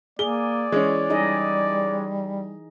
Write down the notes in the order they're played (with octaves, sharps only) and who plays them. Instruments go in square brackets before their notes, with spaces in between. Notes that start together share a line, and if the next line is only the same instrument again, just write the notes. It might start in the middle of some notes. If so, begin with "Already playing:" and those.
[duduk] A#3 [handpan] G#4 [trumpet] D5 [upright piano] G7
[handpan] E3 [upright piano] G#3 C#4
[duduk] G3 [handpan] D#4 G#4 D#5